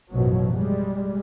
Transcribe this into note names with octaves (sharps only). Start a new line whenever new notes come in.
A1 F#2 B2 F3 F#3
G3 G#3